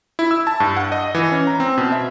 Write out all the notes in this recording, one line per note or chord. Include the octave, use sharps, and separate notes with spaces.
E4
E6
A5
G2
F#5
D#5
E3
C#4
A#5
C4
B2
E5